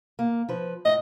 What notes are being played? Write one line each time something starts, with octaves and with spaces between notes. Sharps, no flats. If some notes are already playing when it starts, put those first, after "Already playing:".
A#3
F3 B4
A2 D#5